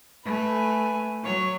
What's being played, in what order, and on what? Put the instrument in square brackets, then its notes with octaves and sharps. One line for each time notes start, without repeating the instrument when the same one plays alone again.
[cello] A3 [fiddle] B4 G#5
[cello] F#3 [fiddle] C#5